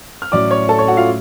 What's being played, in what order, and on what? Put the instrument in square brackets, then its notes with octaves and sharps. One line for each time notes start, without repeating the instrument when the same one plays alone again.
[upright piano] F6
[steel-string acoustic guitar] A2 F#3 C#4 [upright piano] D5 D6
[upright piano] C#5 C#6
A4 A5
C#5 C#6
F#4 F#5
F4 F5